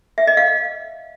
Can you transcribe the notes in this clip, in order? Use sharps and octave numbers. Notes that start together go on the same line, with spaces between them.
E5
D#5
F5